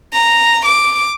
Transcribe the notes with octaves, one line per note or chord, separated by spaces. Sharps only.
A#5
D6